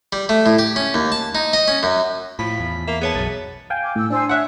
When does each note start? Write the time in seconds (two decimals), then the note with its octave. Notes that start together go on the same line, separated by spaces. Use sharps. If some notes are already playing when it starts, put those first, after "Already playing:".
0.13 G3
0.29 A3
0.46 A2
0.59 G4
0.76 C#4
0.94 D#2
1.12 A5
1.35 D#4
1.53 D#5
1.68 C#4
1.83 F#2
2.39 A2 F3 B5 B6
2.60 E2
2.88 A#3 E5
3.01 B3 G#4 C#5 A5
3.15 B1 F#2 A6
3.70 F5 G5 G#5
3.83 D6
3.96 A2 E6
4.10 D4 C5 G#5 E6
4.29 C#5 E5 F#5 F#6